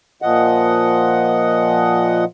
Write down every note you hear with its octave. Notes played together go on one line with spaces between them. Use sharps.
A#2 F3 D#5 F#5